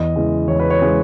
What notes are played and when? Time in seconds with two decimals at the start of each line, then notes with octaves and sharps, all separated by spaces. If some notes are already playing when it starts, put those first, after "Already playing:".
Already playing: E2 D#5
0.16 C#3 E3 G#3
0.48 E2 C#5
0.60 B4
0.70 C#5
0.80 C#3 E3 G#3